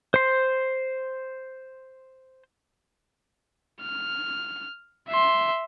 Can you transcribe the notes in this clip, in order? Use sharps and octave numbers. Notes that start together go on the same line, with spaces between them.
C5 C6
F6
E5 C6